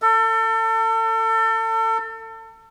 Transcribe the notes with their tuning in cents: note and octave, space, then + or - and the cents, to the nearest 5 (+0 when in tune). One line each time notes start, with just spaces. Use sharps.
A4 +30